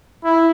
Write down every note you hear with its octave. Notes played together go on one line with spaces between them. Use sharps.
E4